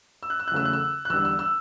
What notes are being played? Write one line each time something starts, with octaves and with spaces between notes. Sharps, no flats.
E6
F#6
E6
F#6
E2 C#3 F#3 A3 E6
F#6
E6
F#6
E2 D3 G3 E6
E6
E6